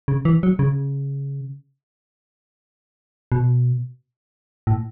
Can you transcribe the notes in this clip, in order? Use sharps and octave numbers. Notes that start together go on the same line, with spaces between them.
C#3
E3
F#3
C#3
B2
A2